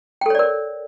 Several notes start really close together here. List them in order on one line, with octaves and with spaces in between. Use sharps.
G5 A4 C#5 D5 A#4